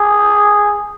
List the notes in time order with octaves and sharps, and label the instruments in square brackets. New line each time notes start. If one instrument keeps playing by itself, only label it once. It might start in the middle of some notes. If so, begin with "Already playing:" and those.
Already playing: [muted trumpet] G#4